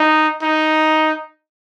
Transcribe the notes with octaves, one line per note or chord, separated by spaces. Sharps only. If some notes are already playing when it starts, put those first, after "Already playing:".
Already playing: D#4
D#4